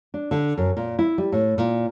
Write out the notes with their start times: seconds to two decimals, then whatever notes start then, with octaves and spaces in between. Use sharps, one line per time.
0.14 D4
0.31 D3
0.57 F#2
0.77 A#2
0.99 E4
1.18 G3
1.32 A2
1.58 A#2